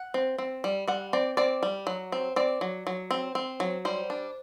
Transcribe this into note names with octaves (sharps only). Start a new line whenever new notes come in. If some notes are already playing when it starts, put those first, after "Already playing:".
Already playing: F#5
C4
C4
G3
G3 F#5
C4 D5
C4 D5
G3
F#3
C4
C4 D5
F#3
F#3
C4
C4
F#3
G3 C5
D4